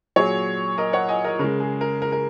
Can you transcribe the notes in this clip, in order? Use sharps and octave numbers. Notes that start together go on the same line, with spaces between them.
A#2 F#3 G#4 C#5
A#4 D#5
C#5 F#5
D#5 G#5
A#4 D#5
C#3 G#3 A#4
G#4
A#4
A#4
A#4